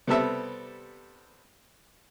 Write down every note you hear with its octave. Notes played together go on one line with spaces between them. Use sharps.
C3 G3 B3 C4 A4 E5